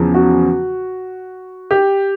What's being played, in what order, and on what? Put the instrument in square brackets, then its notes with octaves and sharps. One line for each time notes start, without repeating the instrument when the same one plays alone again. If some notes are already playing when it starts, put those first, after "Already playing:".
Already playing: [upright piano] E2 C#3 F3
F#4
G4